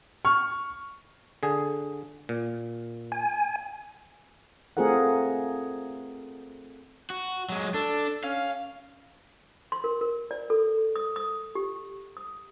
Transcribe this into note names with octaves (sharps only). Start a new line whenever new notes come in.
C#6 F6
D3 G#4
A#2
G#5
A3 C4 F4 G#4 A#4 F#5
F#4
F#3 G#3
D4 A4
C#4 F5
C6
A#4
A#4
D5
A4
D#6
D#6
G4
D#6